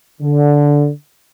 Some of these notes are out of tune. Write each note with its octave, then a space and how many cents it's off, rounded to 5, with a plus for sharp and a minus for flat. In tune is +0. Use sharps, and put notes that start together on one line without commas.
D3 -10